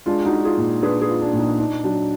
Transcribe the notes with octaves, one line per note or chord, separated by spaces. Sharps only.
G#3 D4 F4
D#4 F#4
D4
F4 G#4
A#2
D4 G#4 B4
G#4 B4
F4
D4
A#2
D#4
D4 D#4
F#3 D4